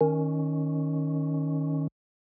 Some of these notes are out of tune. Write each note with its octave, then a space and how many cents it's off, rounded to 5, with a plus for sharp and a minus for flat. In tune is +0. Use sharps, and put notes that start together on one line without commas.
D#3 +0 C#4 +0